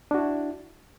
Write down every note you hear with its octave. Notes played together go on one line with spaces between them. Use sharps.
D4 E4 F#4